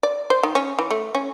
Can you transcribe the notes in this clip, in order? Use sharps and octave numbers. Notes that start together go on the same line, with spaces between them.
D5
C5
D#3
C#4
E3
A3
C#4